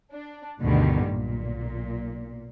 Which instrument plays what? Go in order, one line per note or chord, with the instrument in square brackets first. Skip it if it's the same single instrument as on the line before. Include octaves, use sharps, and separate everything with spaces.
[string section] D4
D2 G2 B2 D3 D#3 G3
B1 A#2